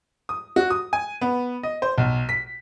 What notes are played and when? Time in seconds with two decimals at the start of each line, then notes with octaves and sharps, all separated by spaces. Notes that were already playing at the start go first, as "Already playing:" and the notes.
0.29 D#6
0.56 F#4
0.71 D#6
0.93 G#5
1.21 B3
1.63 D#5
1.82 C5
1.98 B1
2.29 B6